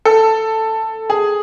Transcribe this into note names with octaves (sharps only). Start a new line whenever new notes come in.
A4
G#4